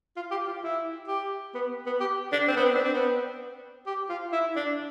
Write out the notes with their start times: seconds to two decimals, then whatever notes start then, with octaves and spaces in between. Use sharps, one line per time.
0.16 F4
0.31 G4
0.47 F4
0.62 E4
1.08 G4
1.54 B3
1.86 B3
2.00 G4
2.32 D4
2.48 C4
2.56 B3
2.65 C4
2.75 D4
2.84 C4
2.93 B3
3.87 G4
4.10 F4
4.32 E4
4.56 D4